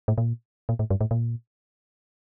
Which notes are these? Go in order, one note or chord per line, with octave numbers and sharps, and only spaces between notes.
A2
A#2
A#2
A2
G2
A2
A#2